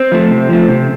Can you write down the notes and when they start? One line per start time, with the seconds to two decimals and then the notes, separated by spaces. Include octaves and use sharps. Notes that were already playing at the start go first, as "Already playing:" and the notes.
Already playing: C4
0.12 F3 A3
0.30 C3
0.49 F3 A3
0.68 C3